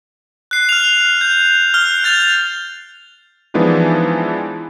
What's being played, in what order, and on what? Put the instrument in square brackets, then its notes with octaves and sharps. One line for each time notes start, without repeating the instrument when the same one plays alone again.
[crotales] F#6 C7
F6 F7
G6
F6 G7
G6 A6 F7
[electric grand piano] E3 F3 G#3 B3 D4 D#4